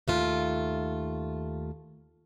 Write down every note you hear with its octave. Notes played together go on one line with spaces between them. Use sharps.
D#2 A3 F4